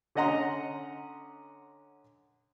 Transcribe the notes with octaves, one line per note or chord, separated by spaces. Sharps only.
D3 C#4 D#5 F#5 A#5 C6